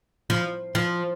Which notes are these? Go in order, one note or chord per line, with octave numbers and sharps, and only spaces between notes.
F3
F3